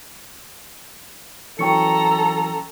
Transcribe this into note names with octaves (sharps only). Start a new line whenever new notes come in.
E3 F#3 C#4 A4 G5 A#5 C#6 C#7